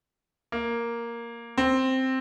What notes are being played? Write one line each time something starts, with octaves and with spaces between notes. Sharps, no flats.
A#3
C4